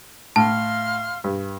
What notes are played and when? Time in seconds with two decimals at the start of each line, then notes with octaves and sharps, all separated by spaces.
0.36 A2 F5 A5 C6 F6
1.24 G2